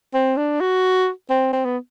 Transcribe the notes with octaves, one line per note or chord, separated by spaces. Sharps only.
C4
D4
F#4
C4
C4
B3